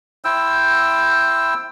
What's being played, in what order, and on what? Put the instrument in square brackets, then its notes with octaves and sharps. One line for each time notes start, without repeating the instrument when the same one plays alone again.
[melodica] E4 C5 G5 E6